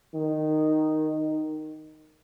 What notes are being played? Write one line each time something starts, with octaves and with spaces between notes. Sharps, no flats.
D#3